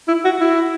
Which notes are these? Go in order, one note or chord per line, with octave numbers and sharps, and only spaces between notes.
E4
F#4
E4